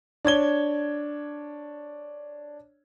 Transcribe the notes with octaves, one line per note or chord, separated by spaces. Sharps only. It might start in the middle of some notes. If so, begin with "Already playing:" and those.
D4 C#5 G#6 G7